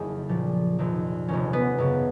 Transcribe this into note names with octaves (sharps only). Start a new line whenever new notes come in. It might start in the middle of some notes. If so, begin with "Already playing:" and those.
Already playing: F#1 F2 D#3 G#4
A#1 A#2 F3
F1 F2 D#3
F1 D#2 D#3 C#4
B3
G#1 F#2 C#3